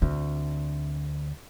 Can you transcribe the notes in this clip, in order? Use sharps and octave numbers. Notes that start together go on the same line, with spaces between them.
D2 C4